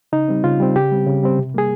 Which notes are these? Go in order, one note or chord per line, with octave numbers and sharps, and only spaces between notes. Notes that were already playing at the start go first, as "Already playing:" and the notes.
C#3 D#4
G3 C4
C#3 F4
G3 C4
C#3 G4
G3 C4
C#3
G3 C4
C3
G3 A#3 G#4